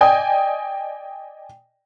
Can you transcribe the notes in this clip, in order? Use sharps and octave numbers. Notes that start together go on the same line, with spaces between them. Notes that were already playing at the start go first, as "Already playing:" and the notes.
D5 D#5 G5 G#5 D#6